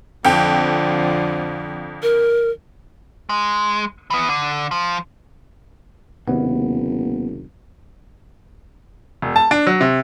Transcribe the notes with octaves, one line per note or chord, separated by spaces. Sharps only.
F2 D3 F3 G5
A#4
G#3
E3 B3
D3
F3
F#1 D#2 C3 B3
E1
A5
D4
F#3
C3